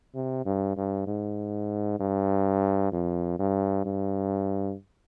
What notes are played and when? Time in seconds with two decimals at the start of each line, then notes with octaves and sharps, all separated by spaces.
0.15 C3
0.45 G2
0.76 G2
1.07 G#2
2.00 G2
2.92 F2
3.39 G2
3.85 G2